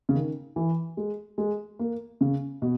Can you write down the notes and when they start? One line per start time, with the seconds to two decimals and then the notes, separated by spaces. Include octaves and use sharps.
0.09 C#3
0.15 D#3
0.56 E3
0.97 G#3
1.38 G#3
1.79 A#3
2.21 C#3
2.62 B2